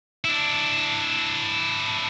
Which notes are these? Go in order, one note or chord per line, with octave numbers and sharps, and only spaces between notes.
D4 E4